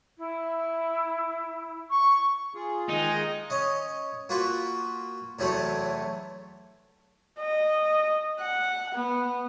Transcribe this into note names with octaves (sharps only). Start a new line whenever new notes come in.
E4
C#6
F4 G#4
D#3 G#3 D#4 D#5
C#4 D#5
A#3 F4 F#4 B4
E2 A2 C3 E3 F#3 A3
D#5
F#5
B3